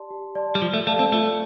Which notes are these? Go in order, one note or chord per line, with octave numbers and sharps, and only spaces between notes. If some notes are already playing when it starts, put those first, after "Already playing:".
Already playing: G4 D5 A5 C6
G4
D5 A5 C6
G3
F3 F4
A3
A3 A4 D5 F5 A5
C4
A3 F4